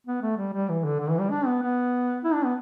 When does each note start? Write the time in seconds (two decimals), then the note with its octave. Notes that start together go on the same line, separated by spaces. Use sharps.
0.07 B3
0.22 A3
0.37 G3
0.53 G3
0.69 E3
0.84 D3
1.00 D3
1.10 E3
1.20 G3
1.31 D4
1.46 B3
1.62 B3
2.24 E4
2.34 D4
2.45 B3